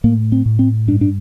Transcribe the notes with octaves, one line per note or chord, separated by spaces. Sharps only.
A2 A#3
C4
A2
C4
G2 D4
D4